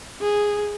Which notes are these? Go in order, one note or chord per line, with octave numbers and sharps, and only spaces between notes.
G#4